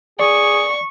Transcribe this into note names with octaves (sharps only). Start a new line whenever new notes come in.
G#4 D5 C#6